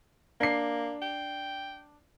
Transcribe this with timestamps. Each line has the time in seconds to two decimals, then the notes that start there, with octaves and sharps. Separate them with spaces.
0.41 A#3 D4 C7
1.02 G5